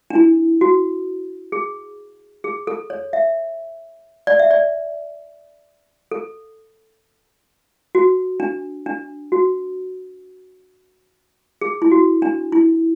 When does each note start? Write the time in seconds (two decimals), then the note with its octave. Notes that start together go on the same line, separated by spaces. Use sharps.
0.10 D4
0.15 E4
0.61 F#4
1.52 G#4
2.44 G#4
2.67 A4
2.90 C#5
3.13 E5
4.27 D5
4.39 E5
4.51 D5
6.11 A4
7.95 F#4
8.40 D4
8.86 D4
9.32 F#4
11.61 G#4
11.82 E4
11.92 F#4
12.22 D4
12.52 E4